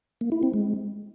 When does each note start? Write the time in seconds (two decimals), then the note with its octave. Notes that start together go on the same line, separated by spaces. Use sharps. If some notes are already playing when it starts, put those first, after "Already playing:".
0.21 A#3
0.32 E4
0.43 C4
0.54 G#3